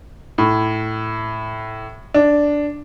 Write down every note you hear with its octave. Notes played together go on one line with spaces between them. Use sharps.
A2
D4